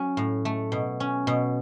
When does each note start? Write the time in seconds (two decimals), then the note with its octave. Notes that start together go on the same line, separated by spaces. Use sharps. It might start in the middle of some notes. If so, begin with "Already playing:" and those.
Already playing: F#3 C#4
0.17 A2
0.45 A3
0.72 B2
1.00 C#4
1.27 B2